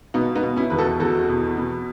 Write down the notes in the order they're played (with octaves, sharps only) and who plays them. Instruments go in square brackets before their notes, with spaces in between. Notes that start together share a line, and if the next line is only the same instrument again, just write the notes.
[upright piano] B2 B3 D#4
B3 D#4
B2
C#4 E4
E2 B4
F#4 A4
E2 F#4 A4
B2
B2